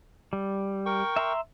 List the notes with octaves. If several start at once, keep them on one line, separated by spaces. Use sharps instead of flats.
G3
A#4 G5 C#6
E5 A#5 C6